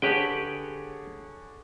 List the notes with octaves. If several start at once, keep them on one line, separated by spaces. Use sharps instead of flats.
D3 G4 G#4 B4 C#5 G5